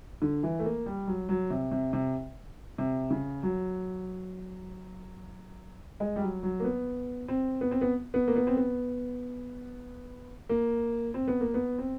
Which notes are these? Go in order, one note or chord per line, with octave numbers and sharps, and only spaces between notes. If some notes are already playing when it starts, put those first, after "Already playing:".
D3
E3
A3
A#3
G3
F#3
F#3
C3
C3
C3
C3
C#3
F#3
G#3
G3
F#3
F#3
A#3
B3
C4
B3
C4
B3
B3
A#3
B3
C4
B3
A#3
C4
B3
A#3
B3
C4